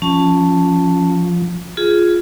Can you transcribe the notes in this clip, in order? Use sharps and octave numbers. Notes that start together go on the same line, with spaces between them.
F3 C#4 A5
F4 G#4